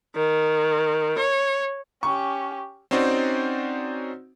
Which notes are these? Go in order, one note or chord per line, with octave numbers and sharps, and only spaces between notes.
D#3
C#5
C#4 G4 C#6
C4 C#4 D#4 F#4 C5 D5